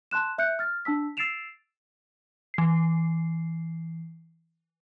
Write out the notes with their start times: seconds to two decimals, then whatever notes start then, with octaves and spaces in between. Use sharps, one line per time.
0.11 A5 C6 F#6 E7
0.38 E5 F#6 G6 C#7
0.59 F6 A6
0.85 D4 A5 E6 B6
1.17 E6 A6 C7 D7 E7 F7
2.54 E3 C7